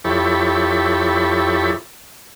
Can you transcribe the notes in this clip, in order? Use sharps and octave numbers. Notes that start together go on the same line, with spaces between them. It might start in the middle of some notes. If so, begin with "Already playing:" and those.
F2 E4 G4 A4 C#5 B5